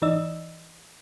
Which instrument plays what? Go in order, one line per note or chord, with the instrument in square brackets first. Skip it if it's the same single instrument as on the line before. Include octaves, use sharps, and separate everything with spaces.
[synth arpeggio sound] G#1 E3 D#4 D5 D#5 E6